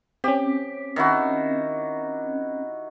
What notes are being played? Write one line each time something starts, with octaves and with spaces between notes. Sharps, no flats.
C4 C#4 G4
D#3 E4 F#4